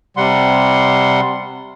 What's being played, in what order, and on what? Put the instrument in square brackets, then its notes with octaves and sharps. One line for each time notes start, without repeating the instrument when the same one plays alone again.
[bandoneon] C3 G3 F#5 C6